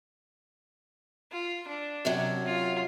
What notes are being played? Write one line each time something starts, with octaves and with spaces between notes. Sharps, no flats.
F4
D4
F#2 C3 F#3
F4